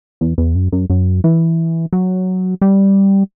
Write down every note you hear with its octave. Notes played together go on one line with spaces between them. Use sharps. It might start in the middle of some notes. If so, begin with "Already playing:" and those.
E2
E2
F#2
F#2
F#2
E3
F#3
G3